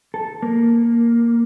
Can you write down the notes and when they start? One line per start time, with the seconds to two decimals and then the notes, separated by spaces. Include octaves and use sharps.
0.14 A4
0.42 A#3